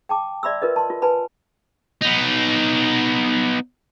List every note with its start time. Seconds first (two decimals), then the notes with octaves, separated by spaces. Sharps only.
0.09 G5 A5 D6
0.43 D5 E5 B5 C6 E6
0.62 F4 A#4 B4 D#5
0.76 A5 C6
0.90 F4
1.02 B4 G#5 A5 B5
2.02 B3 D#4